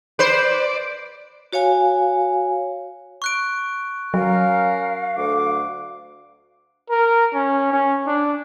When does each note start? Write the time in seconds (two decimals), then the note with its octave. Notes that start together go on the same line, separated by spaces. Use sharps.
0.19 B4 C5 D5
1.53 F#4 C#5 F5 G#5
3.22 C#6 F#6 D7
4.14 F#3 C#4 A#4 F5
5.16 D2 D6
6.90 A#4
7.34 C#4
7.73 C#4
8.07 D4